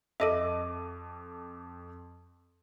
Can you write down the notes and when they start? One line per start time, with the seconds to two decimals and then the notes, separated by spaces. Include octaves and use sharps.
0.20 F2 A4 D#5 E5 D6 D#7